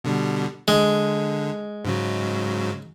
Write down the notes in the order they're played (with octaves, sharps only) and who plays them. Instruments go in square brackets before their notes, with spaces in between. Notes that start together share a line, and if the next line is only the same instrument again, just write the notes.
[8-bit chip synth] B2 D3 G3
[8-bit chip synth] D3 [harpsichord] G#3
[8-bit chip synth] G#2 C#3 F#3